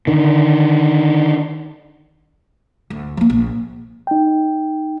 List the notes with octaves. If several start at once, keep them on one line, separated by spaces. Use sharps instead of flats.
D3 D#3
D2
F3 A#3
A#1
D#4 G5